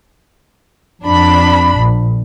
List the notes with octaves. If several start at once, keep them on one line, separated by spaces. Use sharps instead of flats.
F2 D4 B5
A#1